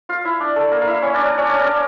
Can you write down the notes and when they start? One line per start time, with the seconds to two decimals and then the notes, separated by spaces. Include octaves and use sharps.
0.09 F4 F5
0.25 E4 E5
0.40 D4 D5
0.56 A3 A4
0.71 A#3 A#4
0.81 F5
0.87 E4 E5
1.02 C#4 C#5
1.14 D4 D5
1.26 D4 D5
1.38 C#4 C#5
1.50 D4 D5
1.59 A#4
1.64 C#4 C#5